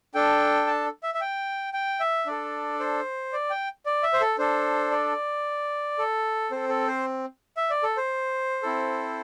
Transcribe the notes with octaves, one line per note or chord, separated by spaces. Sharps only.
D4 A4 G5
A5
E5
E5
G5
G5
E5
D4 A4 D5
C5
D5
G5
D5
E5
C5
A4
D4 A4 C5
D5
A4
C4 A4 C5
A4
C5
E5
D5
A4
C5
C4 E4 A4